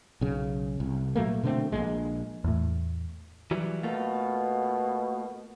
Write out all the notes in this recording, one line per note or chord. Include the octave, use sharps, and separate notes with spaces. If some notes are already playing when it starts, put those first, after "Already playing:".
B1 C#3
C2
A#2 F#3 A3 A#3
B2 D3 A3 C4
A#1 F#2 A#2 G#3
E2 A2
E3 F#3 G3
B2 A3 A#3 F4